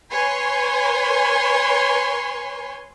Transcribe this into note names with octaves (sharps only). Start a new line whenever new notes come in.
B4 C#5 G#5 C6